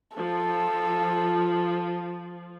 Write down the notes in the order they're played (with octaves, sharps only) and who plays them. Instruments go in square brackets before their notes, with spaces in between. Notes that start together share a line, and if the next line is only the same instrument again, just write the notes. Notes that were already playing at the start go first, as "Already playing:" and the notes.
[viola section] F3 [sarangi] A4